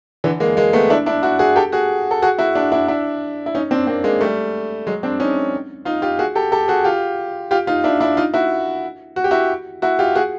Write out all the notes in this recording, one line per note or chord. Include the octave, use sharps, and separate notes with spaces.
D3 E3
G#3 A#3
G#3 A#3
A3 B3
D4 E4
D4 E4
E4 F#4
F#4 G#4
G4 A4
F#4 G#4
A4
F#4 G#4
E4 F#4
D4 E4
D4 E4
D4 E4
E4
C#4 D#4
C4 D4
A#3 C4
G#3 A#3
G3 A3
F#3 G#3
C4 D4
C#4 D#4
D#4 F4
F4 G4
F#4 G#4
G4 A4
G4 A4
F#4 G#4
F4 G4
F4 G4
D#4 F4
D4 E4
D4 E4
D#4 F4
E4 F#4
F#4
G4
E4 F#4
E4 F#4
F4 G4
F#4 G#4